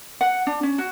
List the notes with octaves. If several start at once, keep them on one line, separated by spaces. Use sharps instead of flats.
F#5
D4
C#4
F#4